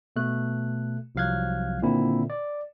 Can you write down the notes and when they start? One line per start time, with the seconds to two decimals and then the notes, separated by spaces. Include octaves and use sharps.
0.16 B2 A3 F#6
1.15 C2 F3 F#3 F5 F#6 G#6
1.82 A#2 D3 D#3 C4 E4
2.30 D5